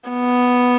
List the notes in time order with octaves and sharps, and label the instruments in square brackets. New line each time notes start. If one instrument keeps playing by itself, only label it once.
[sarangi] B3